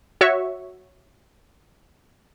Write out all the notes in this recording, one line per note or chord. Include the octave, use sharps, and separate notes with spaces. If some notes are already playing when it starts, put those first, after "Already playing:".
F#4 C#5 E5 C#6